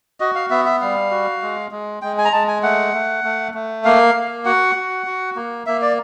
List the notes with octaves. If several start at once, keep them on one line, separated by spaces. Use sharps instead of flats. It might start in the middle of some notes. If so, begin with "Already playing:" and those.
F#4 D#5
F5
B3 E5
E5
G3 F5
F#4
G#3
G#3
G#3 G5
G#5
A#5
G#3 A5
G#5
A3 F#5
A3
A3
A3
A#3 F5
A#3
F#4 F#5
F#4
F#4
A#3
A#3 E5
D5